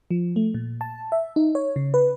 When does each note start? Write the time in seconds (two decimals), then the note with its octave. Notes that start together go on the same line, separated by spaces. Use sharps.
0.11 F3
0.36 A3
0.54 A#2
0.81 A5
1.12 E5
1.36 D#4
1.55 C#5
1.76 C#3
1.94 B4